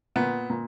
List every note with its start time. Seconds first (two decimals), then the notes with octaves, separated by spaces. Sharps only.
0.16 A#2 B3
0.50 A#2